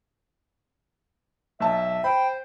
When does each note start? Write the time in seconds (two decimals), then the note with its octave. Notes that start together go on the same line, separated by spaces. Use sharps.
1.60 B1 E5 A5
2.04 C5 G5 B5